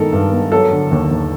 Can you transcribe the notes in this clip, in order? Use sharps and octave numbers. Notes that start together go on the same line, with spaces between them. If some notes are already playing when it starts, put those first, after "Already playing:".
Already playing: G2 D#3 G#3 B3 A4 A#4
G2
B3
F#3 A4
D3
D#2
D#2